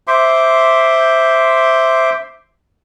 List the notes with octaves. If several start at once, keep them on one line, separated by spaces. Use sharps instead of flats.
C5 E5 C6 D6